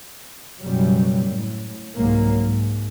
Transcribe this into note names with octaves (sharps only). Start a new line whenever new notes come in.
F#1 F#2 B2 F#3 G3
A2
C2 G#2 F#3 A#3
G#2